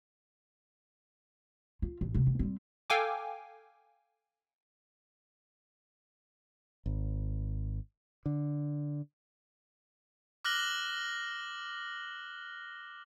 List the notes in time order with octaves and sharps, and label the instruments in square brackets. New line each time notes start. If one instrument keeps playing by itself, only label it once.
[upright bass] F4
A1
D2 C3
D2
G3 C4
[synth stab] A4 F5 G5 G#5 D6
[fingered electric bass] G#1
D3
[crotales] D6 F6 F#6 A#6 F#7 G7